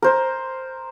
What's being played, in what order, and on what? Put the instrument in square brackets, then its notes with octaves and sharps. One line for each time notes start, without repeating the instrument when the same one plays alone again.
[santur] A#4 C5